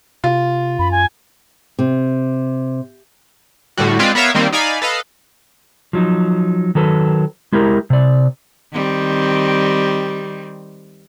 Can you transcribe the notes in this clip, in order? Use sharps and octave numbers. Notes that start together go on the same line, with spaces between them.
C3 F4
F#2 B5
G#5
C3
A2 D3 G3 F#4
G#3 C4 F4 B4 D5
B3 A#4 C#5 E5 F5
D#3 G3 A#3 C4
D#4 D5 F5 G#5 B5
A4 B4 D#5 F5
F3 F#3 D#4
D#3 F#3 A4 B4
G#3 E4 G4 A#4
C3 D5
D#3 G3 C4